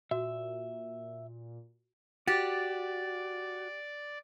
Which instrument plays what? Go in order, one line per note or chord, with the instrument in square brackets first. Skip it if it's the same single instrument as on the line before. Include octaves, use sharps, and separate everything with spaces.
[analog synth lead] A#2 [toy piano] F#4 [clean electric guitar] E5
[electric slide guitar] F#4 [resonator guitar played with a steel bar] G4 [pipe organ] D5 [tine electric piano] A6